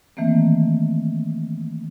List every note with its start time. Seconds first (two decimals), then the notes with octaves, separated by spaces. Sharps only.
0.17 D#3 E3 A3 A#3 C4